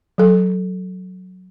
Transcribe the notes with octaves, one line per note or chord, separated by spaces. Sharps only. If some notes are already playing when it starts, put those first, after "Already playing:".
F#3 A4